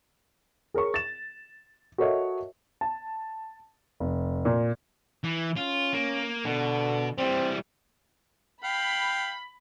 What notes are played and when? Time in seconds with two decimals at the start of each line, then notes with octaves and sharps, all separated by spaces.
0.74 G#4 A#4 C#5 C#6
0.94 A6 E7
1.98 F#4 A4 A#4 C#5 D#5 E5
2.81 A5
4.00 F1
4.45 A#2
5.24 E3
5.57 C#4 F4
5.93 A#3
6.45 B2 D3
7.18 E3 G3 C4
8.64 F5 G5 B5